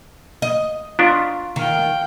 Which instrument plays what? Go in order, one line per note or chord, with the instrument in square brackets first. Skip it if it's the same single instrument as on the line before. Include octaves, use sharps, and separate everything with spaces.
[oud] D#5
[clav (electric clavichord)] B3 D4 [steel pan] F4 A#5 C#6
[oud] D#3 [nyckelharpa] F5 G5